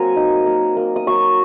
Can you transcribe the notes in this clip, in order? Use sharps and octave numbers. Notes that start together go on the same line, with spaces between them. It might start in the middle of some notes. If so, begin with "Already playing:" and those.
Already playing: F#3 A#3 C4 G#5 A#5
D#4
A#3
A#3
D#6
F#3 C#6